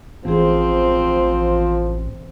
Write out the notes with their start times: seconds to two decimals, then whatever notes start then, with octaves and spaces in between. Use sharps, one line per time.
0.25 A1 E3 F3 C4 G#4